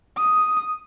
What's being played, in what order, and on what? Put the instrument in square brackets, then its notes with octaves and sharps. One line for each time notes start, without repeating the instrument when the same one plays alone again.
[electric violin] D#6